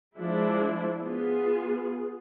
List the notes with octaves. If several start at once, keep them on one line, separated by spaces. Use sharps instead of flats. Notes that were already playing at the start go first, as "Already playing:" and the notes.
F3 G#3 D4 E4
B3 F4 G#4